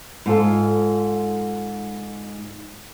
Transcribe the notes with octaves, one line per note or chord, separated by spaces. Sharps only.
G#2 F4 A4